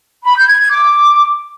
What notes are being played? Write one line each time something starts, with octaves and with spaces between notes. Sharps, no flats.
B5
G6
G#6
G#6
D6